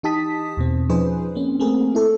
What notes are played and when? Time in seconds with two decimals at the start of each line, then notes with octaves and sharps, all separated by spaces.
0.03 E3 D#4 G4 A5 D#6 B6
0.57 E2 B2 C4
0.89 F3 C#4 D#4 G#4 B4 C5
1.35 A#3 C4 C#4
1.60 A3 A#3 C4 G#4 A#4
1.95 E4 A4